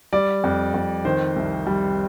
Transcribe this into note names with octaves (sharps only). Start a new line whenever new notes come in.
G3 D5
F2
F2
D#3 C5
C2
G3